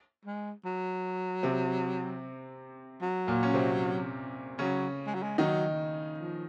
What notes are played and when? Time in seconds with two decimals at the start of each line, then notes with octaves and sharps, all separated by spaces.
0.25 G#3
0.65 F#3
1.43 C3 C4
3.01 F#3
3.27 A#2 A#3
3.43 C#4
3.54 C3 C4
4.59 C#3 F#3 C#4
5.06 G#3
5.14 F#3
5.23 G#3
5.38 D#3 F#3 D#4
6.17 F3